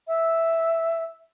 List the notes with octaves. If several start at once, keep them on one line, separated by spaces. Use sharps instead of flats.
E5